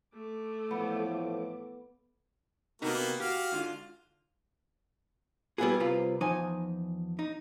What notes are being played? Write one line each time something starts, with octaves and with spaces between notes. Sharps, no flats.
A3 D6
A2 E3 F3 B3
C3 A#3 B3 D#4 F#4 A#4
F#4 G4 F5
G#2 D3 F4
G3 B3 C4 E4 F#4 G#4
C2 C3 F4 B4
E2 F3 D#4 G#5
D#4